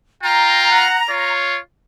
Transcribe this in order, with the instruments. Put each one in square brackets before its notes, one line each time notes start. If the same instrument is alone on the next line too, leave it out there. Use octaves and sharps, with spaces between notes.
[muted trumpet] F4 [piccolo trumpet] G5 [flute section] A#5
[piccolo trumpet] F#5
[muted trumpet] F4 [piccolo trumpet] C#5